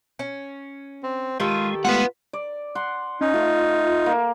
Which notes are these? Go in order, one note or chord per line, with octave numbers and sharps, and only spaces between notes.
C#4
C4
D#3 G#3 F4 G4 A4
G#3 A3 B3 F4 B4 F#5
D5
F#5 C6
C#4 D#4
A3 F4
A#3